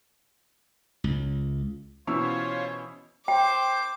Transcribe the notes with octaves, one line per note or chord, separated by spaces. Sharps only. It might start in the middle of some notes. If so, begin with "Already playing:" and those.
C#2
B2 E3 C#4 F4 C5 C#5 C#6 E6
C5 G5 D6